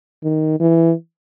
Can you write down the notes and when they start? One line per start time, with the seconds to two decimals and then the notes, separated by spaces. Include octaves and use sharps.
0.23 D#3
0.60 E3